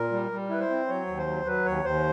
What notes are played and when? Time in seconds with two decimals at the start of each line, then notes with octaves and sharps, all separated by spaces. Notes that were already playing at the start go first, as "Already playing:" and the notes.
Already playing: A#2 A#4
0.12 G3
0.31 G3
0.49 E4 B4
0.60 C5
0.70 C4
0.88 F#3 C#5
1.07 D#2
1.18 C5
1.27 F#3
1.45 F#3 B4
1.65 D#2 C#5
1.84 D#2 C5